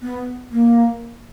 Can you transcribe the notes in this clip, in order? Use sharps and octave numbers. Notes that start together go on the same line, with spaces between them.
B3
A#3